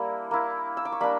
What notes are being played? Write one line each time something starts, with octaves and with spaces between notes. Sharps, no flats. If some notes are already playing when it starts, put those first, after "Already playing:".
Already playing: G3 A#3 D4 E4 A#5
A#3 E4
E6
D6
C#6
G3 A#3 D4 B5